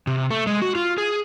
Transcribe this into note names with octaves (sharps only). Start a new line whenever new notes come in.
C3
A3
G#3
F#4
F4
G#4